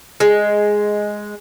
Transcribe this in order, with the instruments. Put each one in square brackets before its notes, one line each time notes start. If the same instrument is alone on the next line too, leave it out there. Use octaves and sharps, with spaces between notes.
[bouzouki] G#3